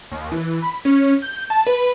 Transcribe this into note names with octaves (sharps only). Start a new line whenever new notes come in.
D#2
E3
B5
C#4
G6
A5
B4